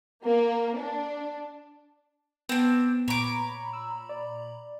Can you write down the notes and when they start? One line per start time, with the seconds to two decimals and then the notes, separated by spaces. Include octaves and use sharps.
0.24 A#3
0.78 D4
2.49 B3 C4 D4
3.08 A#2 C#5 A#5 B5 D6
3.73 E6
4.09 D5